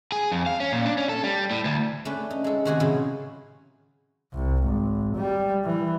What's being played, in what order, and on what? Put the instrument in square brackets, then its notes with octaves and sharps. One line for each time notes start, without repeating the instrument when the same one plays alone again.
[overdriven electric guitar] G#4
F2
F5
C#4
A#2
D4
C#4
A4
G3
A2
D2
[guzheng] A3 C#4 D4 B4
D#4
G#3 A4
C3 D#3 F#4 G#4 C5 G#5
A2 C#3 F#3 E4 F4
[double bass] C2
G#1
G3
E3